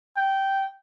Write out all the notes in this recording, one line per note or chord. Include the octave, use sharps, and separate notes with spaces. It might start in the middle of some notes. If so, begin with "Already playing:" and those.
G5